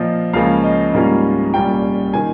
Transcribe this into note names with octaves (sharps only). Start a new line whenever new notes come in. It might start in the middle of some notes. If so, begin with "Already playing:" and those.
Already playing: A#2 F3 C4 F4 D#5
C#2 C#3 F3 A#3 C#4 F5
D#5
G#2 G3 A#3 C#4 F4
C2 A#2 G3 C#4 F4 G5
D#3 A#3 F4 G#5